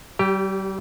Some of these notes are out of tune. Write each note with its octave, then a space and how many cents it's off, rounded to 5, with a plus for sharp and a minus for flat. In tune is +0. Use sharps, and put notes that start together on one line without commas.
G3 -35 G4 +0